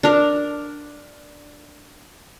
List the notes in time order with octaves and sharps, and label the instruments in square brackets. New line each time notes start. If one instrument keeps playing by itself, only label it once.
[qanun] D4 A#4